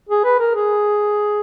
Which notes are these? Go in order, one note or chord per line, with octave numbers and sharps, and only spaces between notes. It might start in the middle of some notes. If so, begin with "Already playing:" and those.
G#4
B4
A#4
G#4